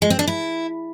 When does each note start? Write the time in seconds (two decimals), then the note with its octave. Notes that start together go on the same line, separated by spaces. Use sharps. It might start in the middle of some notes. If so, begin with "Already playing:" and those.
0.02 G#3
0.10 C4
0.19 D4
0.27 E4